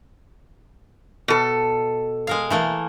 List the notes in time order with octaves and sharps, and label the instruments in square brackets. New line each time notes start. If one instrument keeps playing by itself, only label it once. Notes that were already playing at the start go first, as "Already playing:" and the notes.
[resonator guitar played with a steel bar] B2 A4
[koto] G#3 A#4 F5
E3 A3 A#3